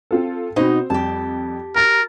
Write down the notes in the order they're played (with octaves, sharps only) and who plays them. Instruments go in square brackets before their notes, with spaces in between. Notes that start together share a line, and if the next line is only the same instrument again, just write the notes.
[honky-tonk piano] C4 F4 A4
[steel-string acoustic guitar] B2 D#4 [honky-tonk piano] C4 C5
[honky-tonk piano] F2 G3 [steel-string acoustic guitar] G4 A5
[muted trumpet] A#4 [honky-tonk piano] A#5 A6